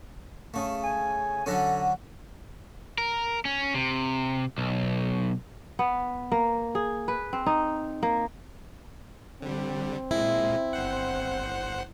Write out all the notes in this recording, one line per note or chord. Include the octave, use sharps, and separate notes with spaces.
C#3 A3
G#5
D3 F#3 C#4 A4
A#4
C#4
C3
B1
B3
A#3
G#4
B4
C4
D#4
A#3
D3 G3 C4
A#2 G#3 E4
G1 C5 F#5